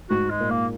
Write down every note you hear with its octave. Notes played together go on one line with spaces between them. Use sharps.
G#2 F#4
G#3
A#2
A#3